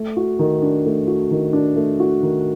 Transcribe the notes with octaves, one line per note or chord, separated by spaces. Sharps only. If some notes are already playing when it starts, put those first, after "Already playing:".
Already playing: A3
F#4
D#3
D4
A3
F#4
D#3
D4
A3
F#4
D#3